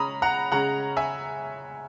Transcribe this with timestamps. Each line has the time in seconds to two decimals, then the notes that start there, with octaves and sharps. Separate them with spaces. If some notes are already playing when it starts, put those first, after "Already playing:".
Already playing: C#3 G#3 C#4 A#5 B5 D#6
0.22 F#5 A#5
0.51 C#3 G#3 C#4 F#5 A#5
0.97 E5 G#5